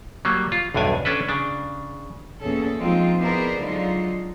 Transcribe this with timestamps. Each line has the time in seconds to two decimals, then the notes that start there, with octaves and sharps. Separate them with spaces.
0.25 F#3 G3 A#3
0.52 F4
0.74 B1 E2 G2 D4 G#5
1.05 C#4 D4 A4 B4
1.29 C#3 D4
2.41 E2 A#2 C#4 G#4 A4
2.78 F3 G#3 C4 D#4 F4
3.19 B3 E4 G#4 A#4 C5 D5
3.61 D3 F#3 G#3 D#4 F4